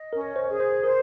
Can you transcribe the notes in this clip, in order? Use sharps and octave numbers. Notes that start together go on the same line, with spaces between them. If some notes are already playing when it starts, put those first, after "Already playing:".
Already playing: D#5
C#4 A#4
C5
G#4
C5
A#4 C5